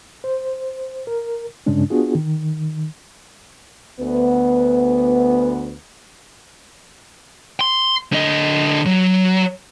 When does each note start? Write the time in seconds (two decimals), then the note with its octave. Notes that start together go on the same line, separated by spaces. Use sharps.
0.24 C5
1.07 A#4
1.66 G2 C#3 G#3 C#4 D4
1.90 B3 D4 F4 F#4 G#4
2.15 D#3
4.00 D2 B3
7.61 C6
8.13 D3 D#5
8.86 F#3